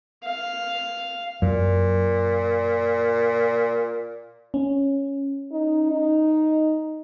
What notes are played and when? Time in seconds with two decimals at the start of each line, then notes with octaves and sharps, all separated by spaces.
0.24 F5
1.42 F#2 A#2
4.54 C#4
5.52 D#4
5.91 D#4